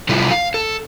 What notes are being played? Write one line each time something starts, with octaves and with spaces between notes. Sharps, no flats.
C3 F#3 G3 E4 F4 A4
F5
A4